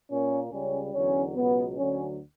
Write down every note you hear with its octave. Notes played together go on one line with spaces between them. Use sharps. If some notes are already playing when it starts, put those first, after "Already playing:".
A#2 A#3 C#4
C#2 C#3 G3 C#4
E2 D3 F#3 C#4
C#2 B2 F#3 B3
D2 D3 F#3 C#4